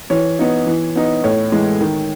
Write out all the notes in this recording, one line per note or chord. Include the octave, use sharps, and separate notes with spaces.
E3 C#5
B3 D#4
E3
B3 D#4
A2 C#5
E3 G#3
D#3